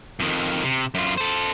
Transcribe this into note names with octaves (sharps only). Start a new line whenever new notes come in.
F2 D#3
C3
F#2 F4
A4 C5